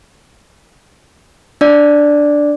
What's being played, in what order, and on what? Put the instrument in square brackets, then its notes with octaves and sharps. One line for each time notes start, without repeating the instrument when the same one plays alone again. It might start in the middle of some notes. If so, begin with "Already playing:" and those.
[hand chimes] D4 D5